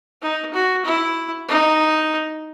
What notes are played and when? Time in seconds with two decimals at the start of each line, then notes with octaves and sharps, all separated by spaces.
0.22 D#4
0.54 F#4
0.85 E4
1.49 D#4